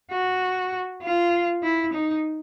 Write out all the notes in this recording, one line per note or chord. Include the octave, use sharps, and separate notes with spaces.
F#4
F4
E4
D#4